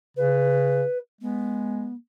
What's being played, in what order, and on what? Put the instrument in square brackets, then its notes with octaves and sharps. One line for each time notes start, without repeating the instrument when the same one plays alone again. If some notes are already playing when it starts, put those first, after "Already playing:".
[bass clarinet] C#3 [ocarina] B4
[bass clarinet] G#3 [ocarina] B3